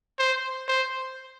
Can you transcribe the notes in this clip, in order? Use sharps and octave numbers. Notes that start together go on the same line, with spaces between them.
C5
C5